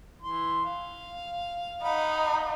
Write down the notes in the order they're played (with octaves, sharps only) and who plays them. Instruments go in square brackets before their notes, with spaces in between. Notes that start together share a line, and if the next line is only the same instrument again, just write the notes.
[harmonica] E3 C6
F5
[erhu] D#4 [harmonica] F5 F#5 B5